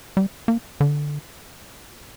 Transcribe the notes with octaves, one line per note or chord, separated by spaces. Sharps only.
G3
A#3
D3